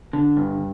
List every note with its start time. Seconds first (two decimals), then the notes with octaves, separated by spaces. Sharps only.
0.13 D3
0.37 G2